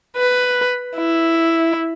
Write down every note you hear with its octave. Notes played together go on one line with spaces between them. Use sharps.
B4
E4